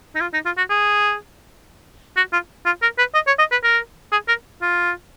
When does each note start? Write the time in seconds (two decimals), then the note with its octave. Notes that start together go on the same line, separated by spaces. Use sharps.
0.15 D#4
0.21 F4
0.33 D#4
0.46 F4
0.57 F#4
0.70 G#4
2.17 F#4
2.33 F4
2.66 F4
2.82 A#4
2.98 B4
3.14 D#5
3.27 C#5
3.39 D#5
3.52 B4
3.63 A#4
4.12 G#4
4.28 A#4
4.62 F4